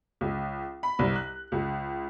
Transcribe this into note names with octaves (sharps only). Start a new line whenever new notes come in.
C#2
B5
C2
F#6
C#2